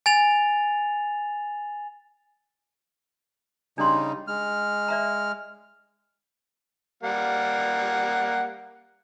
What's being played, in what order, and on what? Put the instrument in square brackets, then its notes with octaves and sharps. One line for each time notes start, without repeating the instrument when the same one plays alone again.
[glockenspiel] G#5 A6 F7
[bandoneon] C#3 G3 D#4 [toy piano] D4 C6
[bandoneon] G#3 F6
[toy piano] D5 E5 A#5
[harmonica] G3 A#3 F#5